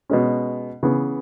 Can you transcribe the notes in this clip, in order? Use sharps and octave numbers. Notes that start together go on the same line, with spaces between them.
B2 G#3 C#4
C#3 E3 B3